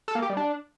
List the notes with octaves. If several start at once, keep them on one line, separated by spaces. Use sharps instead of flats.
A4
A#3
G4
G3
D4